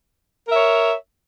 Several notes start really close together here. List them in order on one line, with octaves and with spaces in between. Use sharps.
A#4 E5 C#5